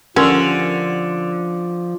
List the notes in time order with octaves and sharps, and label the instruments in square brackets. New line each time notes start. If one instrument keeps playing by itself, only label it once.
[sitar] D3 [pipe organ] F3 [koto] C#4 [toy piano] G4 A#4 C6